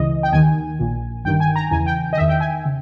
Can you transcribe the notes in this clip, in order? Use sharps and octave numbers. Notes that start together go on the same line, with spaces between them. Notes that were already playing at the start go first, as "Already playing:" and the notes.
Already playing: C#2 C#3 E3 D#5
G5
D#2 D#3 G#5
A#1 A#2
G1 G2 D#3 G5
G#5
A#5
E2 C#3 E3 G#5
G5
D#5
E2 D#3 E5
G5
G#5
C#3